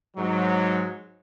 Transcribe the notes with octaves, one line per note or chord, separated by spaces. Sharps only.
G#2 F#3